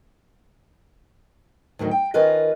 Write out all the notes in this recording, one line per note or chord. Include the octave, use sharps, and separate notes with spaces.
D2 A2 D#3 F#3
G5
D#3 C#4 F4 A#4 B4 D#5